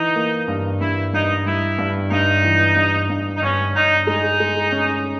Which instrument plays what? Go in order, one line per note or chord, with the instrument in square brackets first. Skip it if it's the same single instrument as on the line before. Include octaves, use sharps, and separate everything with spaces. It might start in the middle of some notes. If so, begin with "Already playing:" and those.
Already playing: [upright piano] E3 [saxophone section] D#4
[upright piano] A#3
G2
[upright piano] G2 [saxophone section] E4
[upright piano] G2 [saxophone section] D#4
[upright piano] G3 [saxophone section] E4
[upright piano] G2
[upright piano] G2 [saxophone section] D#4
[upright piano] E3
G2
G2
[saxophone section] D#4
[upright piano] G2 [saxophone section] C#4
[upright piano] G2 [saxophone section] D#4
[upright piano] G#3 [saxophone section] D#4
[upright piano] G#3
C#4